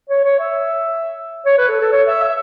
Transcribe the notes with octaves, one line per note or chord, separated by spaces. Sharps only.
C#5
C#5
E5
C#5
B4
A4
A4
C#5
E5
E5